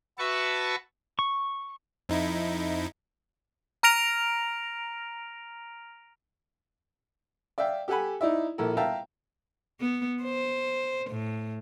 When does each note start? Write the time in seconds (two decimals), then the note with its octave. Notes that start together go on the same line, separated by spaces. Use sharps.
0.19 F#4 B4 E5 A5 C#6
1.19 C#6
2.09 F2 D#4 E4
3.83 A#5 F6 A#6 D7 F7
7.58 D5 E5 F5 G5
7.88 G4 A4 F#5 G#5 B5
8.21 D#4 E4 D5 E5
8.58 A#1 E4 A4 A#4
8.77 E5 F5 G5 A5 A#5
9.80 B3
10.23 C5
11.11 A2